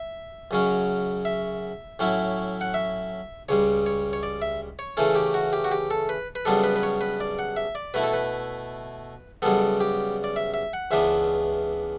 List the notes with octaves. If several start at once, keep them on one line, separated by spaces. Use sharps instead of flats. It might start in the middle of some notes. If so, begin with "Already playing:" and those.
Already playing: E5
F#2 C#3 F#3 C#4
E5
A2 F#3 C#4 E4
F#5
E5
C#2 C#3 G3 C#5
C#5
C#5
D5
E5
C#5
C#3 E3 A3 C#4 A4
G4
F#4
G4
F#4
G4
A4
B4
B4
F#2 C#3 G3 B3 D4 A4
B4
B4
C#5
B4
D5
F#5
E5
D5
B2 A3 E4 B4
A4
B4
F#2 C#3 G3 B3 A4
G4
D5
E5
E5
F#5
C#2 C#3 E3 B3 D4 E5